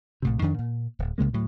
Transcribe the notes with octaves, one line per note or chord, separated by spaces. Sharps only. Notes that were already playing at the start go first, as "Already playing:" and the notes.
A#1 A2 C3
F2 D#3 D4
A#2
D1
C2 C#3 G#3 A#3
D2 A2 F#3